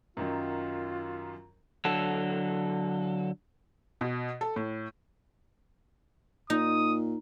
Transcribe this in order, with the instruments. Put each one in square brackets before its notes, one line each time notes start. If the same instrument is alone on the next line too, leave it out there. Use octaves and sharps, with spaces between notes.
[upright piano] F#2 D#3 F#3 [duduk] F4
[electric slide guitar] D3 F#3 A4
[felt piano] B2
A4
A2
[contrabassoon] A#2 [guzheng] D#4 [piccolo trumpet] D#6